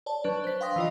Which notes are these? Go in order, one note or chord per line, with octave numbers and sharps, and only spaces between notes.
C#5 D5 A5
F#3 D4 B4
C5 B6
F5 G5 C6 D#6 A#6
E3 F4 D#5